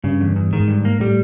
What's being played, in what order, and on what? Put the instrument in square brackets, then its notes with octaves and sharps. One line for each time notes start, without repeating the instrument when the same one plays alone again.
[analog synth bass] G2 [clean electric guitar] C#3
[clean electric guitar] E2
E2
[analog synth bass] G#2 [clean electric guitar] D#3
[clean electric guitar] G2
A#3
[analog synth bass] A2 [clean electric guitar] G3